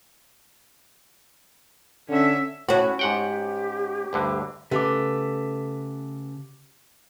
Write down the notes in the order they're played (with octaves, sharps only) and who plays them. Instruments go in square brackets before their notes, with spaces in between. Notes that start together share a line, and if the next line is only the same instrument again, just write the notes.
[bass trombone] D3 [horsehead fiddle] C#4 E5
[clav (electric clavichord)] A2 [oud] C#4 F#4 [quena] E4
[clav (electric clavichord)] G#2 F#5 G5 [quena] G4
[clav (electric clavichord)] D2 G2 D3
[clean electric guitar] C#3 [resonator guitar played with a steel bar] A3 B3 [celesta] G4 D6